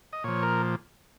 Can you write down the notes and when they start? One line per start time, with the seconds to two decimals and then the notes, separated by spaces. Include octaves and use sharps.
0.13 D#5
0.24 A#2 F3 C#5
0.43 A#4